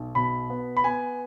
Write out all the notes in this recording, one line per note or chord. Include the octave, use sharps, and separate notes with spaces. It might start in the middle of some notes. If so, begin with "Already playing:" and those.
Already playing: B1
B2 B5
B3
B5
B3 G#5